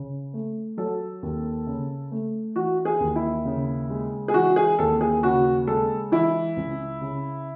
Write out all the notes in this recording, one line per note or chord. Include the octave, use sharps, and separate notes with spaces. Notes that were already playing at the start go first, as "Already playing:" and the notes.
Already playing: C#3
A3
F#3 A4
D#2
C#3
A3
E3 F#4
G#4
D#2
E4
C#3
G#3
G#4
E3 F#4
G#4
D#2 A4
G#4
C#3 F#4
G#3 A4
E3 E4
C#2
C#3